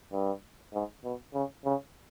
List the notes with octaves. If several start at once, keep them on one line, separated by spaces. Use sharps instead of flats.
G2
G#2
B2
C#3
C#3